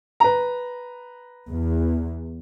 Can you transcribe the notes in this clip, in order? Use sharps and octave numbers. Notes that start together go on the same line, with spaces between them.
B4 A#5
E2